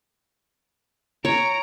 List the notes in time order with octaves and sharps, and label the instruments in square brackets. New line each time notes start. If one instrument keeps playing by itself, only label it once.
[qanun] C#5 [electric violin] A#5 D7